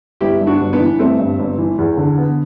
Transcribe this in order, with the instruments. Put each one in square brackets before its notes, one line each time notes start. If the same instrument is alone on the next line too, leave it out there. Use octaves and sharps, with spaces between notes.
[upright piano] G1 [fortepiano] E4 G4
[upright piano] G2
[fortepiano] D4 F#4
[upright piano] G1
[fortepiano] B3 D4
[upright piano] E3
[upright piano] G1 [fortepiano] A3 C4
[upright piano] G2
G1
E3
E2
D3
B3